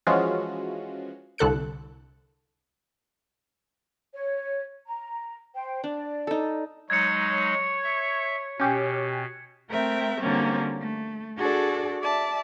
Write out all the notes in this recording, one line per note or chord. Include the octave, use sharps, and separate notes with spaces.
E3 F3 G#3 C#4 F4 F#4
C2 D3 A4 F#6 C#7
C#5
A#5
C5 G5
D4 D5
D#4 A4
F#3 G#3 D#4 C#5 G#6 C#7
E5
B2 C#4 G4
A3 C4 A#4 E5 G5
D3 F#3 G3 A#3 C4 C#4
A3
D4 F#4 G#4 A4 D5
D5 E5 A5